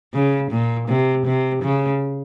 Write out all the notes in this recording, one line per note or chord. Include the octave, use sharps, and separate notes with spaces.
C#3
A#2
C3
C3
C#3